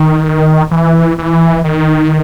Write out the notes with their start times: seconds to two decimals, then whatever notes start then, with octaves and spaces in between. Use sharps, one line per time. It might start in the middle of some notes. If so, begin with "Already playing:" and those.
Already playing: D#3
0.71 E3
1.18 E3
1.64 D#3